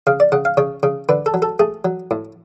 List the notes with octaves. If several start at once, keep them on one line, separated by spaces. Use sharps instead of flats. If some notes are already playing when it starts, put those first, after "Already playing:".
C#3 F5
D5
C#3 F#5
F5
C#3 C#5
C#3
D3 B4
A4
F#3
A4
A3 G#4
F#3
A2